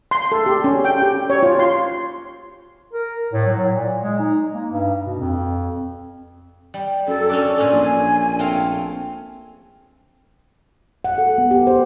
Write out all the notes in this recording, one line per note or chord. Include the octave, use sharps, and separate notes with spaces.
C6
A4
G4
C#4
G5
G4
C#5
F4
C6
A#4
A2
F#3
A#2
G#3
D#4
A#3
G2
B2
F2
G3
F#2 A4
C#4 D4 D5
A#2 C#4 G#5
A#1
A3 C4 F5
F#5
A4
B3
G4
C5